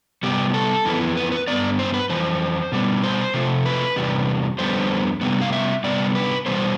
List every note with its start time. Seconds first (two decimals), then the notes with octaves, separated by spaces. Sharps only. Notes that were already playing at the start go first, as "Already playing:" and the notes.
0.23 C3 G3 B3 G4
0.54 A4
0.85 F2 E3 B3
1.17 B4
1.32 B4
1.47 G2 E3 B3 D5
1.79 C5
1.94 B4
2.09 F2 E3 C5
2.72 B2 G3 B3
3.04 C5
3.34 C3 F3 A3
3.66 B4
3.96 E2 C3 G3
4.59 F2 D3 G3 B3 C5
5.21 C3 G3 B3
5.41 F5
5.53 E5
5.84 C3 G3 B3 D5
6.15 B4
6.46 E2 B2 G3 B3 C5